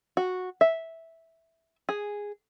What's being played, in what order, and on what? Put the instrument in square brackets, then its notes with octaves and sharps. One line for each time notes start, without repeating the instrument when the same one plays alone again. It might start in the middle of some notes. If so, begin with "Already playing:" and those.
[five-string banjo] F#4
E5
G#4